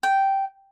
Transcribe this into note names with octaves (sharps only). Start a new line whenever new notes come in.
G5